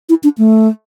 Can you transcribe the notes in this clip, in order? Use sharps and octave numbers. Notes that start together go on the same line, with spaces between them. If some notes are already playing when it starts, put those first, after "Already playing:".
E4
D4
A3